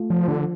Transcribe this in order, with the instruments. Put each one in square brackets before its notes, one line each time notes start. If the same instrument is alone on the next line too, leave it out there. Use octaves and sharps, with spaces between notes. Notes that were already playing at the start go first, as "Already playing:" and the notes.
Already playing: [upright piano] A3 F4
[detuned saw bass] F3
[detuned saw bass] D3 [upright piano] F3